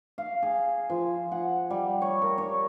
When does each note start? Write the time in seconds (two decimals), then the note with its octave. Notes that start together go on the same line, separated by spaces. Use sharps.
0.18 F5
0.42 G#4
0.90 F3
1.32 F#5
1.70 G3
2.02 C#5
2.22 A#4
2.38 C#5